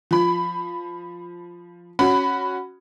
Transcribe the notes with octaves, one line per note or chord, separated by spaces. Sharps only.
F3 B5
C#4 F#4 B5